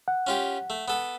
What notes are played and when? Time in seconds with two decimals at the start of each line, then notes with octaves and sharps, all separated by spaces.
0.08 F#5
0.27 C#4 F4 G4
0.70 A3
0.88 B3 A4